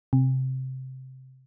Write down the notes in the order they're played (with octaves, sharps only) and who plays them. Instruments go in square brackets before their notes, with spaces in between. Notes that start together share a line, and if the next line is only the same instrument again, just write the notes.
[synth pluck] C3